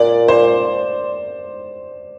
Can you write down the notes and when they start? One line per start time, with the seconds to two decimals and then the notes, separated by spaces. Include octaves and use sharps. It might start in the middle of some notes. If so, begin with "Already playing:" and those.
Already playing: A#2 D5
0.28 C5